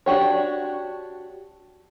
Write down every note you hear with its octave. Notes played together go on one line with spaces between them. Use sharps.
D4 F#4 G4 C#5